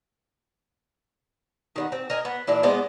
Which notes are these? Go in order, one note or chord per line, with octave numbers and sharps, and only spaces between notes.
D#3 F#3 B3
C4
A#4 D#5 G#5
B3
A#2 E3 D4 E4
G#3 B3 C5 D5